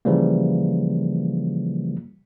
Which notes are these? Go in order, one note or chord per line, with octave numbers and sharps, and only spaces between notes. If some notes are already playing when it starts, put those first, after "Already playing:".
C#3 E3 F3 G3 A#3